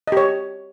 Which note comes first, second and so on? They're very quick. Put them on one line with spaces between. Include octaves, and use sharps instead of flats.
D#5 G4 C#5